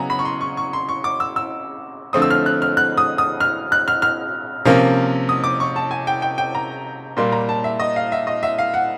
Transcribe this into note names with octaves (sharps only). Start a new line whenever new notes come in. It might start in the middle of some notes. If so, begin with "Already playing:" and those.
Already playing: C#3 F#3 B3 G#5 A#5
B5
C#6
C6
C#6
C#6
C6
C#6
D6
E6
E6
D3 F3 A3 C4 D#6
E6
F6
F#6
F6
F#6
D#6
D#6
F6
F#6
F6
F6
C3 F3 A#3 C#4
D#6
D6
C#6
A5
G#5
G5
G5
G5
A#5
A#2 G3 A#3 C6
A#5
A5
E5
D#5
F5
E5
D#5
E5
F5
F#5